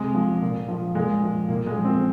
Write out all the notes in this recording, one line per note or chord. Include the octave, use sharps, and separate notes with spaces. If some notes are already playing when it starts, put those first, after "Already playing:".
Already playing: C3 G#3
F3
A#2
F3
A#2 G#3
F3
A#2 A#3
G#3
F3
C4